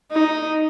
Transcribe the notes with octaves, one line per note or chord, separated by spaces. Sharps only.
D#4